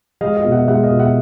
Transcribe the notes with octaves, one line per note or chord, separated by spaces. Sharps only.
G#3 D#5 F5
D#5 F5
B2
E5 F#5
G#3 E5 F#5
D#5 F5
B2
E5 F#5